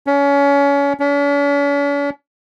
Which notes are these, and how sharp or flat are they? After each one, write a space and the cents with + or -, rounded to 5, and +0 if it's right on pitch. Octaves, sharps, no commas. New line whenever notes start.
C#4 +30
C#4 +45